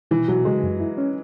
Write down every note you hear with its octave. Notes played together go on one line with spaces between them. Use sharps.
B2 E3
B2 F#3
C#3 G#3
F#2
E4
C#4